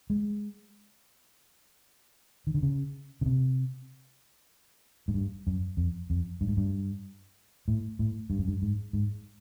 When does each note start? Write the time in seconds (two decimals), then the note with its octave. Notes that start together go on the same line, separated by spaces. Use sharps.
0.10 G#3
2.47 D#3
2.54 D3
2.63 C#3
3.21 C#3
3.26 C3
5.08 G#2
5.14 G2
5.47 F#2
5.77 F2
6.10 F2
6.41 G2
6.48 G#2
6.57 G2
7.68 A2
7.99 A2
8.30 G2
8.39 F#2
8.48 G2
8.62 G#2
8.93 G#2